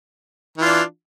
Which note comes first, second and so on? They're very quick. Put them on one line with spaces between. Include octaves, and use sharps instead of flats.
E3 F4 D4